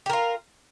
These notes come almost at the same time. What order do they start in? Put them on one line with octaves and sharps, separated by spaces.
G4 A#4 F4